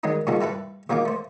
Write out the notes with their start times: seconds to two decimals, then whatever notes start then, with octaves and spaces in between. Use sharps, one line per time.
0.03 D#3 F#3 G#3 D4 D#4
0.27 A#2 C#3 G3 D#4 F#4 A4
0.41 G3 E4 A4 B4
0.89 A#1 F#3 A#3 D#4 F5 D6
1.05 A3 C5